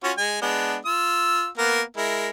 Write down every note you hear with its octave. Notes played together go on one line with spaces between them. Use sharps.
C#4 F4 F#4
G#3 G#5
G#3 B3 D4
F4 E6
A#3 B3 A#4
G#3 E4 A#4